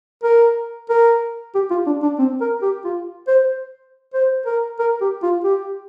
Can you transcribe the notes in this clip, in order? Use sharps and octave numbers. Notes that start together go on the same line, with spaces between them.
A#4
A#4
G4
F4
D4
D4
C4
A#4
G4
F4
C5
C5
A#4
A#4
G4
F4
G4